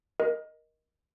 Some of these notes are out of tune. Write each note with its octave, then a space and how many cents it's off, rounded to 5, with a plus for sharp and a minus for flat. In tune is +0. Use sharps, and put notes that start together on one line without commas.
A#4 +15 D#5 +0